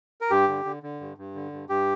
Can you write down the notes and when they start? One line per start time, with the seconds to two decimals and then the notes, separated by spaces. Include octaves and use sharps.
0.21 A#4
0.31 G2 G4
0.48 D3
0.65 D3
0.83 D3
1.00 G2
1.18 G2
1.35 D3
1.52 G2
1.69 G2 G4